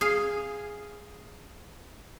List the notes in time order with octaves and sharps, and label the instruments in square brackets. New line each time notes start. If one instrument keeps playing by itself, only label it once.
[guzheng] G#4 F5